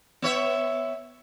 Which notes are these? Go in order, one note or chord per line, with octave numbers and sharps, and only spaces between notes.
B3 C#5 E5